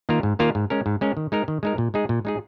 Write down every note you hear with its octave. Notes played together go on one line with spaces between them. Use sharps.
D#3 A#3 F4 A#4
G#2
D#3 A#3 F4 A#4
G#2
G#3 C#4 A#4
G#2
G#3 C#4 A#4
D#3
G#3 D#4 A#4
D#3
G#3 D#4 A#4
A#2
G#3 D#4 G#4
A#2
G#3 D#4 G#4